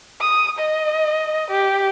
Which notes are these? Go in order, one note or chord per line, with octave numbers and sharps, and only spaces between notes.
D#6
D#5
G4